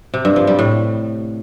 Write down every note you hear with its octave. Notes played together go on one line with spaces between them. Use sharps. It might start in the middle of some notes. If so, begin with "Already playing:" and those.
C3
G2
F3
G3
A2